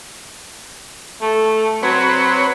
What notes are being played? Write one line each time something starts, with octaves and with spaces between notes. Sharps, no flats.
A3
F#3 C4 B4 C#5